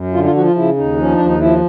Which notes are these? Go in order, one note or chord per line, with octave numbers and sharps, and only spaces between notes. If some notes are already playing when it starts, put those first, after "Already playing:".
Already playing: F#2
D3 F4
F4
F3 F#4
F4
C#3 E4
D#2 D#4
F3 C#4
D4
D#2
D#4
F3 E4